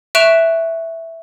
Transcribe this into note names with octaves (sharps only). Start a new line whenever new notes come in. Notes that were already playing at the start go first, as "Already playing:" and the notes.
E5 C#6 F#6 D7 E7 F7